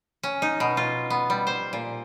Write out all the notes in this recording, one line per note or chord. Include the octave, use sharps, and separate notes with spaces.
C#4
D#4
B2
F4
B3
G3
C5
A#2